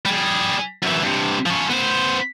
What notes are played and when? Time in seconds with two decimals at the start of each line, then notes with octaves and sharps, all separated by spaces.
0.05 G3 G#4
0.83 F#2 E3
1.02 G2 C3
1.46 F3 C#4
1.69 B3 C5